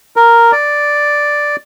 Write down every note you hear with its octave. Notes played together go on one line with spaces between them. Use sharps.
A#4
D5